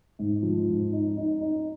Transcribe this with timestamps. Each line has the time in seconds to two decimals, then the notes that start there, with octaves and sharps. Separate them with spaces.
0.19 G#2
0.43 F3
0.67 G#2
0.92 D#4
1.17 D#4
1.41 D#4